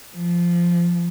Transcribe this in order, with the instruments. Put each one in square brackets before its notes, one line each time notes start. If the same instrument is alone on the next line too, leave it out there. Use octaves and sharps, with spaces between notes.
[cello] F3